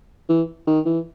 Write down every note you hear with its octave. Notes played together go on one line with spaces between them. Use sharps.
E3
D#3
E3